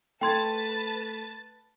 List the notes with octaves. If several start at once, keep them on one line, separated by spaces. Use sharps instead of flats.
A3 B4 G5 A5 C6 G#6 A6